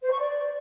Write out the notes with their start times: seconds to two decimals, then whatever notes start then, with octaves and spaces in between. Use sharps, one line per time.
0.02 C5
0.10 C#6
0.19 D5